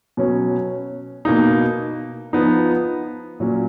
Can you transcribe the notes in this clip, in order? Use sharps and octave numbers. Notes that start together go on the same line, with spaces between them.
B2 F#3 C#4
B2 A#3 D#4
F3 B3 D#4
A#2 F#3 C#4